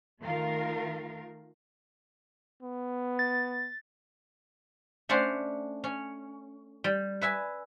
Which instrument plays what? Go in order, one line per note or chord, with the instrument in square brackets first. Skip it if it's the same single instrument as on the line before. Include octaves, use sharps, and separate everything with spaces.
[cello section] D#3 A3 F4 A#4 F5
[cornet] B3
[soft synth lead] A6
[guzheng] A3 C#4 D4 C5 F#5
C#4
G3
B4 E5 G#5